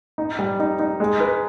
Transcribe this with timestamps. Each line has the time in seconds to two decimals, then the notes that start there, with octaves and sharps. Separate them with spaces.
0.18 D#4
0.39 G3
0.60 D#4
0.79 D#4
1.00 G#3
1.20 B4